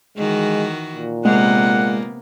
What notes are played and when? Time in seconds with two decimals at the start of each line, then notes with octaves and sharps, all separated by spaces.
0.17 D#3 E3 G#3 F#4
0.95 A#2
1.25 C3 G#3 A#3 B3 F#5